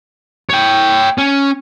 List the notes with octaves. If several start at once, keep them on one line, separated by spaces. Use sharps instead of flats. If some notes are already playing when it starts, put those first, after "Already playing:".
C#5 G5
C#4